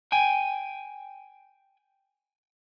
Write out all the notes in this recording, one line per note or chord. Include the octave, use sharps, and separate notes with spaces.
G5 G#5